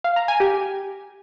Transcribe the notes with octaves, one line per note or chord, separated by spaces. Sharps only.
F5
A#5
G#5
G4